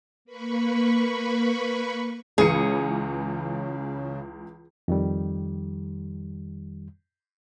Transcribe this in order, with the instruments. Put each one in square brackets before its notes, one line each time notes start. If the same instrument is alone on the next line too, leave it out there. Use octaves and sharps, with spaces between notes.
[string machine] A#3 B4 B5 C#6
[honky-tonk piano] C#2 E3 C#7 [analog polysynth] C#3 [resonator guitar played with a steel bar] G#4
[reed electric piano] F2 D#3 G3